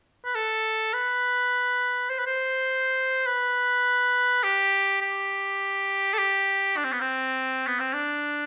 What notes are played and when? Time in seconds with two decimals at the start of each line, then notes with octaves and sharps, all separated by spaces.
0.25 B4
0.35 A4
0.94 B4
2.10 C5
2.19 B4
2.26 C5
3.27 B4
4.43 G4
5.01 G4
6.14 A4
6.18 G4
6.77 D4
6.84 C4
6.93 B3
7.01 C4
7.67 B3
7.80 C4
7.93 D4